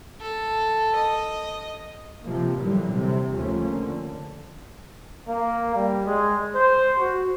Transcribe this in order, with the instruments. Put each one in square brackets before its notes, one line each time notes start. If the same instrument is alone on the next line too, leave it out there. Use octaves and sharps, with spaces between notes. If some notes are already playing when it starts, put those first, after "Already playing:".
[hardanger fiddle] A4
D#5
[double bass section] C3 F3 A#3
A#2 D3 E3 F#3 G3
C3
D#2 C#3 F3 A3 A#3 C#4
D3
[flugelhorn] A#3
G3
G#3
C5
F#4